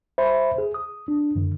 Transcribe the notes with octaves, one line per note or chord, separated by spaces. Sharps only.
C5 E5 B5
G#4
D#6
D4
F#2 D3